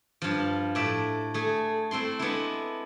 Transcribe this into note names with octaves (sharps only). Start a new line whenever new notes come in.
G2 F3
A2 D5 E5
A3 G#4
A3 C4 E4 C6
G#3 B3 D4 E4